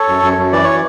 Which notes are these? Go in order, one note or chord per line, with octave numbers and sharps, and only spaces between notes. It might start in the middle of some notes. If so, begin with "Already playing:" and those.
Already playing: A4 C#5
F#2
F#2
F#2
E3 D5
C#5